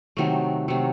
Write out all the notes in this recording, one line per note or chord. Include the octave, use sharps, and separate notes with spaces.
C3 D#3 F#3 A3
C3 D#3 F#3 A3